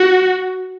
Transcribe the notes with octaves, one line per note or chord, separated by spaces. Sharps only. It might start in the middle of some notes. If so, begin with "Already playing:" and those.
Already playing: F#4